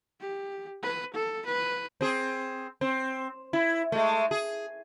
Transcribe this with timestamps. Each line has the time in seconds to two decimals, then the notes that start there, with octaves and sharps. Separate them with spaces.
0.21 G4
0.83 B4
1.14 A4
1.46 B4
2.01 C4 G#4
2.81 C4
3.53 E4
3.92 G#3 A3
4.31 G#4